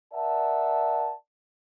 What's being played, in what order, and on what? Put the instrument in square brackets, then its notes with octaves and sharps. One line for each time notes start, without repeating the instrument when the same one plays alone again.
[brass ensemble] A#4 D5 E5 F#5 A5